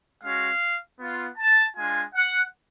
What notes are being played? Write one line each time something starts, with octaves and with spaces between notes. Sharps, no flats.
G#3 C#4 F#4 F5
B3 F4
A5
G#3 D4 F4 G#5
F#5